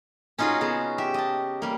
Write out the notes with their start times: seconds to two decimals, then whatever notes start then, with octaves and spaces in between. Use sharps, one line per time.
0.38 C#4 D#4 F4 F#4 G#4
0.61 C#3 B3
0.98 G4 E5
1.14 D#5 A5
1.62 G3 A#3